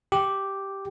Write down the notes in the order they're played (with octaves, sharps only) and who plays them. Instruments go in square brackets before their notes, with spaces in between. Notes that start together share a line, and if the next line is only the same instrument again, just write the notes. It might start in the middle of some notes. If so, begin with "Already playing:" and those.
[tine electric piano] G4